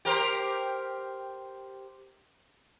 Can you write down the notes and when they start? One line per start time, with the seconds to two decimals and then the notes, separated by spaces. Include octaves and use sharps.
0.05 G4 A#4 C5